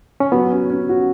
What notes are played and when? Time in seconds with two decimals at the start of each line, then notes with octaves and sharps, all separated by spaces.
0.20 C#4
0.32 F#3 B3
0.51 C#4
0.70 C#4
0.89 F#4